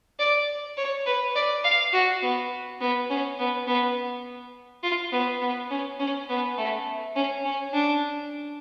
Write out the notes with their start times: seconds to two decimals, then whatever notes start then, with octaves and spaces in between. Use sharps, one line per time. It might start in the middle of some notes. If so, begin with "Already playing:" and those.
0.19 D5
0.77 C#5
1.06 B4
1.36 D5
1.64 F5
1.94 F#4
2.22 B3
2.81 B3
3.10 C#4
3.39 B3
3.67 B3
4.83 F4
5.12 B3
5.42 B3
5.70 C#4
6.00 C#4
6.29 B3
6.58 A3
7.16 C#4
7.45 C#4
7.74 D4